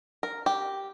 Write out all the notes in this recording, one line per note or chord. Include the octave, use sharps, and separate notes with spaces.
A#4
G4